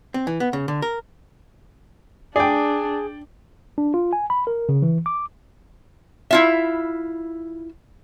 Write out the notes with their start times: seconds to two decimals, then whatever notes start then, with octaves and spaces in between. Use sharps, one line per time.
0.14 C4
0.27 E3
0.40 B3
0.53 C#3
0.68 D3
0.82 A#4
2.36 D4 G#4 D5 G5
3.78 D4
3.94 F4
4.13 G#5
4.30 B5
4.47 A#4
4.69 C#3
4.82 E3
5.06 D6
6.31 E4 F4 E5